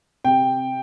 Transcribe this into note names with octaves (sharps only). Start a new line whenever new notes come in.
C3 G5